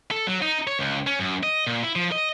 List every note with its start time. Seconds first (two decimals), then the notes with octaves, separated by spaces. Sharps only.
0.11 A4
0.27 F#3
0.42 D#4
0.67 C#5
0.79 C#2
1.07 C#4
1.19 F#2
1.43 D#5
1.67 A#2
1.83 E4
1.96 F3
2.12 D#5